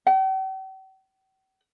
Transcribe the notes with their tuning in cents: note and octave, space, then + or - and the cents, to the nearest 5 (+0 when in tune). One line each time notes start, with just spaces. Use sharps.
G5 -45